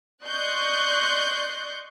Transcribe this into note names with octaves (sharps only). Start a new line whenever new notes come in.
D5 D#5 C6 C#6 F#6 G6